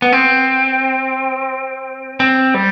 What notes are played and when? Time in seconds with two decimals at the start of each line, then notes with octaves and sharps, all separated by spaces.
0.02 B3
0.13 C4
2.20 C4
2.54 G3